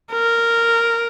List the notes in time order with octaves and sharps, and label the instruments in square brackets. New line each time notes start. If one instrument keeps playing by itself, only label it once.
[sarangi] A#4